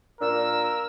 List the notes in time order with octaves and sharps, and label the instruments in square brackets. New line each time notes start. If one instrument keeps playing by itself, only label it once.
[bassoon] A#2 [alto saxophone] D4 [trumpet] A#4 [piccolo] E6